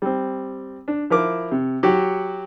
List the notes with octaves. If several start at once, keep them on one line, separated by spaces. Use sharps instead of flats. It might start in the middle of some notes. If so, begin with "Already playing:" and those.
G3 C4
D4
F3 E4 A#4 D6
C3
F#3 F#4 G4